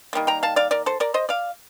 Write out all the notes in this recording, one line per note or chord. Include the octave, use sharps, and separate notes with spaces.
D#3 G3 A#3
G5 A#5
F5 A5
D5 F5
A#4 D5
A4 C5
A#4 D5
C5 D#5
D5 F5